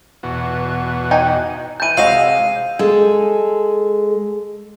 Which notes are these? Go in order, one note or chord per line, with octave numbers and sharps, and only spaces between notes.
E2 B2 F#4
D#4 G5 G#5
E3 A5 G6 D#7
C3 G#3 F#4 D#5 F5 E6
G#3 G#4 A4